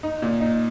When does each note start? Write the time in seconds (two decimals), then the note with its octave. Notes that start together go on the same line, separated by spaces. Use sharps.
0.03 D#4
0.22 A#2
0.41 D#4